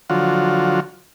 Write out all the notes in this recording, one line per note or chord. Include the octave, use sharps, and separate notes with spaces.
D3 F3 F#3 F4 F#4